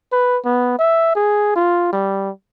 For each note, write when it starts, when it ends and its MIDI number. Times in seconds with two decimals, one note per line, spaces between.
0.12 0.38 71
0.45 0.75 59
0.79 1.15 76
1.15 1.55 68
1.56 1.89 65
1.93 2.30 55